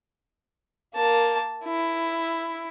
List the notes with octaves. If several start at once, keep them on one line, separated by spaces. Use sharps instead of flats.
A#3 A5
E4